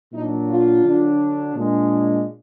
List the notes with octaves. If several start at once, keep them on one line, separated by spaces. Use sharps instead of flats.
A#2 F#3 D4 D#4
F4
D3 F#3 D4
A#2 G#3 D4